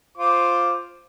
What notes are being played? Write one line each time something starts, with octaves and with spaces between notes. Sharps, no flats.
F4 C5 D6